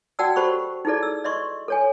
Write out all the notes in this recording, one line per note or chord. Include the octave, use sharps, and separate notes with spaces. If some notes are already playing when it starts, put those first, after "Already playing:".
F#4 D5 F#5 G5 A5 E6
F#4 G4 A4 C5 B5 C#6
D#4 E4 G#4 A4 D5
E6
D5 D#5 C6 C#6
A4 C#5 G#5